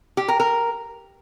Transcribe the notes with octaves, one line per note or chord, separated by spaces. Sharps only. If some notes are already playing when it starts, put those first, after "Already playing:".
G4
A#4
A#4